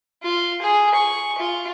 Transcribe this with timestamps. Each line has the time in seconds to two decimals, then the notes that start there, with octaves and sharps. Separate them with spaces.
0.23 F4
0.62 G#4
0.95 C#6
1.38 F4